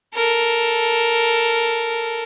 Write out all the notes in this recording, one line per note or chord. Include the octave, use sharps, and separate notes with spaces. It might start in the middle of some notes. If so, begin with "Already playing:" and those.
A4 A#4